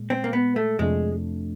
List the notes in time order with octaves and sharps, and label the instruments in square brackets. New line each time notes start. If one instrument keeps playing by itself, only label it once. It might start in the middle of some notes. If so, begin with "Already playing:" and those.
Already playing: [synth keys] A#2 G#3
[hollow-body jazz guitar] C4
A#3
B3
A3
[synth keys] F2 C3 F3 A3 D4 [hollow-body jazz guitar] G#3